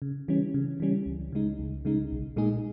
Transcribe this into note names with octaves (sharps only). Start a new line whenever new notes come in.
C#3
E3 G3 C#4
C#3
E3 G3 C#4
C#2
C#3 G#3 D#4
C#2
C#3 G#3 D#4
B1
A#2 G#3 D#4 G#4